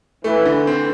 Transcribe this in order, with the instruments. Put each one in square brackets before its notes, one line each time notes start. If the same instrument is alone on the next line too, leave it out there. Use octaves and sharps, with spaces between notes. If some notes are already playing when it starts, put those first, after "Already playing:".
[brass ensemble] E3 [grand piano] A3
[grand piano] D3
C4